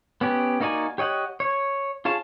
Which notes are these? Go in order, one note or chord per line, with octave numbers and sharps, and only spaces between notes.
B3 C#4 G4
A#3 D#4 F#4 D5 G#5
G4 C#5 D#5 F#5
C#5
F4 G#4 C#5 A5